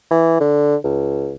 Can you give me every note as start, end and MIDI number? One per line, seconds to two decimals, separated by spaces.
0.11 0.38 52
0.40 0.76 50
0.84 1.34 37